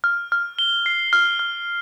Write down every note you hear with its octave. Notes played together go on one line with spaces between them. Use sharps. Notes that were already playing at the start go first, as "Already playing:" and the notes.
F6
F6
G7
C7
F6
F6